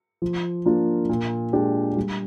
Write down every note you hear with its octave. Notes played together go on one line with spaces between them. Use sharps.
F3
A#3 D4 F4
A#2
G#3 D4 G4
G3